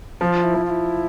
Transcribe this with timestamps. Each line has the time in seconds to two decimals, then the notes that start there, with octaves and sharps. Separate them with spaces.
0.21 F3 F4
0.44 E4
0.54 F3
0.66 F4
0.70 E4